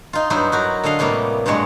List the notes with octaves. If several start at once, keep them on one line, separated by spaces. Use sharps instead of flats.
D#4 F4
G2 F#3 B3 D#4 E4 C5
F#3 F#4 A#4
D3 A4 D#5 F5
A2 C3 G3 A#3 B3
G2 A#2 F#3 G#3 C#5